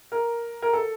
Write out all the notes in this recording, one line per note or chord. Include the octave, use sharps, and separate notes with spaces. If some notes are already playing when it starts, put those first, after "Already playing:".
A#4
A#4
A4